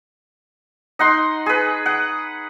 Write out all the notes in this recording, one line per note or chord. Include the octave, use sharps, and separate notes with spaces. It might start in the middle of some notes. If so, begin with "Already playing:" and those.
D#4 F#5 C6
G#4 B4
F#5